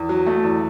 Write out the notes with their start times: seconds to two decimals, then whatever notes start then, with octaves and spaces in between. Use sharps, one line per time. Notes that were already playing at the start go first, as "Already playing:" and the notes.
Already playing: E2
0.09 F#3
0.26 A3
0.43 E2